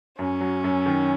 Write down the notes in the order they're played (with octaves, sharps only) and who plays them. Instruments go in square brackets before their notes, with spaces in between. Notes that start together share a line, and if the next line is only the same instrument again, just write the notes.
[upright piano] F#2 [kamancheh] C#4
[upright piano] F#3
F#2
D#3